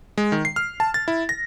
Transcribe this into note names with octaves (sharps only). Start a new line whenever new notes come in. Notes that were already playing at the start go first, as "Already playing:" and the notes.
G#3
D#3
C7
F6
A5
A6
E4
A#6